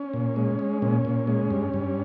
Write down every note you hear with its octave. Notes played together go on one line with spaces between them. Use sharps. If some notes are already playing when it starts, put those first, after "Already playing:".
Already playing: C#4
A#2
G#3
G#3
A#2 C#4
A#2
G#3
G2
G2